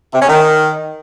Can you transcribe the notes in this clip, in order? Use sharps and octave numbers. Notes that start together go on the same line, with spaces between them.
C3
C#4
D#3